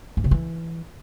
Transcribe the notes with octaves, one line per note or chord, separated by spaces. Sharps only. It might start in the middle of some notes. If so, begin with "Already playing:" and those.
G2
C3
E3